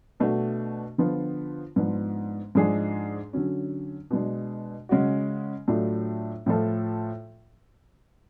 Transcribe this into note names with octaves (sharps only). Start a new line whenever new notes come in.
B2 A3 D4 F#4
D3 F3 B3 F4
G#2 F3 B3 D4
G#2 F3 G#3 D4 G#4
D3 F#3 C#4
B2 G#3 D4
C#3 G#3 C#4 F#4
A2 F#3 A3 D4 F4
A2 F3 A3 F4 A4